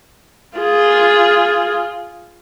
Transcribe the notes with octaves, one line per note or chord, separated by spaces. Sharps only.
F4 G#4